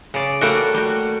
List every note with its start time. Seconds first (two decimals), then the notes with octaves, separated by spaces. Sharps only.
0.14 C#3 D5
0.41 G3 A3 A#3 F#4
0.74 G3 F#4